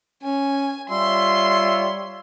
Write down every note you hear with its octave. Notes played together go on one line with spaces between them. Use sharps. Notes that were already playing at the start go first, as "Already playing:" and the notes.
C#4 G#5
G3 F4 C#5 E5 C6